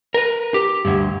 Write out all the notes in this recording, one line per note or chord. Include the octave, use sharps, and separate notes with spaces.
A#4 B4
G4
D2 G2